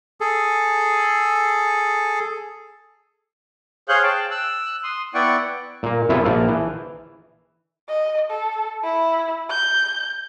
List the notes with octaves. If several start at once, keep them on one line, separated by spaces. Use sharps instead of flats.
G#4 A4
G#4 C5 C#5 F5 F#6 G6
G5 A5
E6 F#6
C6 D#6
B3 E4 D5 F#5 G5 C#6
A#2 A#3
F#2 C3 B3 E4 F4 A4
A#1 F3 A#3 D5 F5
E3
D#5
A4
E4
G6